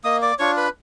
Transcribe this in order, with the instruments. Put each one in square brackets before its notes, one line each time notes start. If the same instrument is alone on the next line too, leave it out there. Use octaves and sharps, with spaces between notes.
[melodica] A#3 D#5 D#6
D5 D6
D4 F4 C#5 C#6
B4 B5